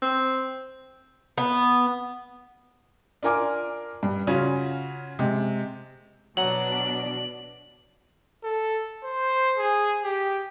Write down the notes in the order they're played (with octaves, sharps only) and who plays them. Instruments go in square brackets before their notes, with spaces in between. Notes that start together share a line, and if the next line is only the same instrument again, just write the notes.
[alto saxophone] C4
[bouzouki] B3
[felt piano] D4 F4 A#4 G#5 D6
G2
C#3 C#4 F4 F#4
C3 G#3
[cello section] B2 D4 [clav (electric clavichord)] F#3 F#5 A#5 [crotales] F#7
[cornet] A4
C5
G#4
G4